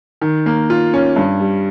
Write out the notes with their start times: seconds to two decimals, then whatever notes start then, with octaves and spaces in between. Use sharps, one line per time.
0.21 D#3
0.46 A#3
0.70 F4
0.94 C#4
1.16 G2
1.40 G3